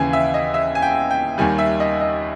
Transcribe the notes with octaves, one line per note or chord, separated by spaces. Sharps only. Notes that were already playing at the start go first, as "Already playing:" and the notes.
Already playing: D#2 C#3 E3 G5 G#5
E5
D#5
E5
G#5
G5
G5
D#2 D#3 G3 G#5
E5
D#5
D#5